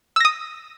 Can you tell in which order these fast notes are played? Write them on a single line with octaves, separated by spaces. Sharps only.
E6 A#6 D#6